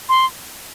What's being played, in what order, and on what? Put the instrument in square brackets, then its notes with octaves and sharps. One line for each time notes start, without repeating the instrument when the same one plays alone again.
[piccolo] C6